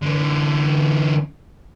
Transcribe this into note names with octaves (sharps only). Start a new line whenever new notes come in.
D3 E3